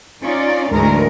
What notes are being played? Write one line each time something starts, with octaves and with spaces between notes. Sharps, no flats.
C#4 D#4 F4 D5
D2 G#2 E3 G#3 A#4